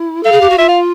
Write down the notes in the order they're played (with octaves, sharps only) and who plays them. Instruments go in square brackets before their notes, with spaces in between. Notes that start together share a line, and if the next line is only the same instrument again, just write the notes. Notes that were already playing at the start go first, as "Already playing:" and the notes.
Already playing: [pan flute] E4
[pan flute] A4 [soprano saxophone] F5
[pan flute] G#4
G4
F#4
[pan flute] F4 [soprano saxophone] E5
[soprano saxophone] F5